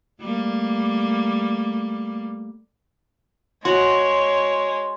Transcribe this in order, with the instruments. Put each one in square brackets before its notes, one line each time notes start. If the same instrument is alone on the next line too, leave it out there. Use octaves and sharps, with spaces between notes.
[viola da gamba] G3 A3 A#3
[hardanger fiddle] G#3 [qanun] F#4 [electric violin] C#5 [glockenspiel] C6